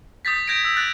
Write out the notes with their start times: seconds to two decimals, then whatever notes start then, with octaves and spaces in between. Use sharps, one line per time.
0.25 D#6 G6 A6 B6
0.47 G6 G#6 A#6 D7
0.65 E6
0.77 F#6 A6